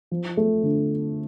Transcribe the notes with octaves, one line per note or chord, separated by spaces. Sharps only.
F3
A3
D3